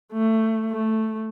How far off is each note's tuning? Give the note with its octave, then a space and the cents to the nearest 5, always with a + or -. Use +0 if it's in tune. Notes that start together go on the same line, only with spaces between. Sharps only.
A3 +15
A3 +0